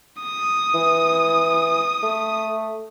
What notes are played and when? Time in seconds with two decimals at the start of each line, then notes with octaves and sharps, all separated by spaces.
0.22 D#6
0.74 E3
2.03 A3